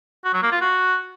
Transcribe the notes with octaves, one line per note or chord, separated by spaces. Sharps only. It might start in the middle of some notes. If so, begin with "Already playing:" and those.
F#4
F#3
A#3
F4
F#4